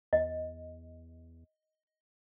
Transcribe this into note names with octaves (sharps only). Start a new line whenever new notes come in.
E2 D#5